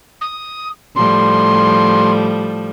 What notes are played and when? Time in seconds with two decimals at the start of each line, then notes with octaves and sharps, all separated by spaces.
0.21 D#6
0.95 A2 F3 G3 C6